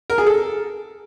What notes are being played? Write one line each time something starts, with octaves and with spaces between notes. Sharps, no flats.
A#4
G#4
A4